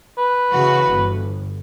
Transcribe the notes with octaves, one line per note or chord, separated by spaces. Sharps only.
B4
C#3 E3 F#4
G1